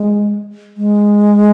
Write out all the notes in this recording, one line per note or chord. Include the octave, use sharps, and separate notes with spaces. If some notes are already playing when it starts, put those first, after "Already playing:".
Already playing: G#3
G#3